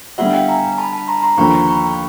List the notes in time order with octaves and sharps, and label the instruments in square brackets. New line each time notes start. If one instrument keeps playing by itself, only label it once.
[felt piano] D3 G3 B3 E4 G4 [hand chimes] E5 F#5
[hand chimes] F5 G5
G#5 A#5
A5 B5
A5 B5
A#5 C6
A#5 C6
[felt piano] D#2 D3 F3 A#3 [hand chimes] B5 C#6
[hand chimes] A#5 C6
B5 C#6